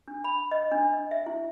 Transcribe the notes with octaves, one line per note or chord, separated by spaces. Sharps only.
D4
B5
D#5
D4
D#5
E5
E4